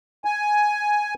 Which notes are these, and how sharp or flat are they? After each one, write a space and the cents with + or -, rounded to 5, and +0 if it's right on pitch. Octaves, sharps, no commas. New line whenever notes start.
G#5 +5